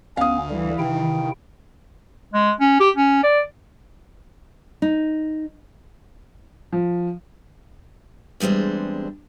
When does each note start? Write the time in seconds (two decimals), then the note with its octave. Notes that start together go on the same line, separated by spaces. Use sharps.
0.17 D2 B3 C#4 F5 D#6
0.50 D3 E3 G3
0.79 C3 D#3 E4 G5
2.34 G#3
2.60 C#4
2.80 G4
2.96 C#4
3.23 D5
4.82 D#4
6.72 F3
8.40 E2 G3 G#3 C4 D4